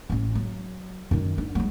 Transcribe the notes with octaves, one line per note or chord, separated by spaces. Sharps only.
A1 C#4
F#3
F#2 D#3
D4
F#3 G#3